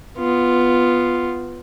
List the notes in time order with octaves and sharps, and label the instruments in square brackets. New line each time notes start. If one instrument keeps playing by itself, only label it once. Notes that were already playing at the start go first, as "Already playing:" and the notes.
[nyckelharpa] B3 F4